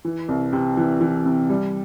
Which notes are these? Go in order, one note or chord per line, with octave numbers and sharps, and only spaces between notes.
E3
C2
C3
E3
E3
C3
G3